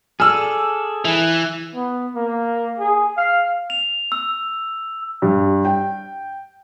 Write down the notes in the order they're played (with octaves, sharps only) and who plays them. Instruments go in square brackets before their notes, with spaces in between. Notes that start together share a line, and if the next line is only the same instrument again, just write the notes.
[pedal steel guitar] G#4 A4 D5 [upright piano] E6 F6
[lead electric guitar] E3
[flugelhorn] B3
A#3
G#4
F5
[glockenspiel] F7
E6
[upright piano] G2
G5